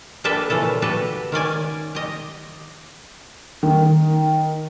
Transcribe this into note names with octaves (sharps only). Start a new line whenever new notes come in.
A#3 D4 G4 A4 B4 E5
A#2 C#3 E3 A4
F#4 G4 A4 B4
D#3 C#4 D5 G#5
G4 D#5
D#3